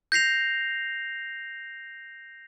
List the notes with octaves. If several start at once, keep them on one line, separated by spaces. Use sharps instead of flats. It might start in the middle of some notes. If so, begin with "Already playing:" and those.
G6 A#6 C7 F7